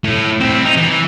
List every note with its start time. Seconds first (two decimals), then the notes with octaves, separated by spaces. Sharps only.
0.04 A2
0.41 C4 E4
0.65 D#4
0.77 E3